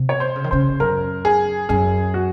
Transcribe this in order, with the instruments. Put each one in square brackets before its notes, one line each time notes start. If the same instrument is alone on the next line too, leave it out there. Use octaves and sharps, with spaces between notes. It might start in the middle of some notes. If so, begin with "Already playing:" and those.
Already playing: [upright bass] C3
[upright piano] C#5
C5
[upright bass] C#3
D#3
[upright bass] C#3 [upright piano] C5
[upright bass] F#2 [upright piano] A#4
[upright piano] G#4
[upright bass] F#2 [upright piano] G#4
[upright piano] F#4